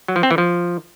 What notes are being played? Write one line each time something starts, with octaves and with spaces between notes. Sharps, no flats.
F#3
F3
C4
E3
F3